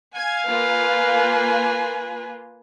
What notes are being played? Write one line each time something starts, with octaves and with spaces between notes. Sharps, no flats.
F5 G#5 G#6
A#3 F4 B4 G#5